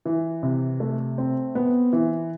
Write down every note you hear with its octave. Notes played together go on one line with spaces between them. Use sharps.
E3
C3
A3
C4
B3
E3